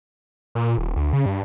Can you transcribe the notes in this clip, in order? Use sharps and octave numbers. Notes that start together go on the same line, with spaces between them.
A#2
D#1
D2
C#3
G2